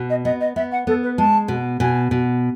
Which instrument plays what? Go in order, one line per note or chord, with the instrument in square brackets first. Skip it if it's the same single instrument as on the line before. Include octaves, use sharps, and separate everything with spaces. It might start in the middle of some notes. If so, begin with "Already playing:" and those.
Already playing: [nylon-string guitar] B2
[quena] D#5
[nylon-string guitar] B3 [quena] D#5
[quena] D#5
[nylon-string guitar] B3 [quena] E5
[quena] F#5
[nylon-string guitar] B3 [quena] A4
[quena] B4
[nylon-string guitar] G#3 [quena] A5
[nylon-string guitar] B2
[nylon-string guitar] B2 [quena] G#5
[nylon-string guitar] B2